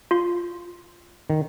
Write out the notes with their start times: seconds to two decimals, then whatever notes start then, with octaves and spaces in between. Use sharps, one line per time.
0.11 F4 C6
1.30 D#3